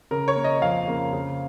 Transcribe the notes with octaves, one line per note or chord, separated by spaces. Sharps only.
C#3 A#4
C#5
A#3
D#5
F2 F5
C#3 A#3
C#3